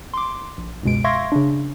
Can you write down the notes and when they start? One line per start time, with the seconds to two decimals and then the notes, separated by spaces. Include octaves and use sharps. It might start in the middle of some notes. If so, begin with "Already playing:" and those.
0.14 C6 D6
0.58 A#1
0.83 C#2 F#2 B2 G#3 D7
1.04 E5 F5 C6 C#6 G#6 A#6
1.32 C#3 D4